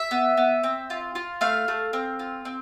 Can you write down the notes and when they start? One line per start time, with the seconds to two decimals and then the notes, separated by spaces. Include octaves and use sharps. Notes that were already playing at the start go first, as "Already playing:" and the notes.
Already playing: E5
0.11 B3
0.37 B3
0.63 C4
0.90 F4
1.15 F4
1.41 A3 F5
1.68 A3
1.93 C4
2.19 F4
2.45 C4